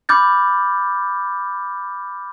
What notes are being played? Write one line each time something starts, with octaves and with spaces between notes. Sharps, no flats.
B5 D6 F6 G6 A6